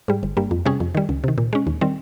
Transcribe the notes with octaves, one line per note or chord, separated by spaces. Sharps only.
G#2 G3
G1
G2 G3 A#3
F2
C3 G3 C#4 G#4
F2
D#3 G3
C#2
C3 D#3
A#2
G#3 C#4
D#2
D#3 G3 C4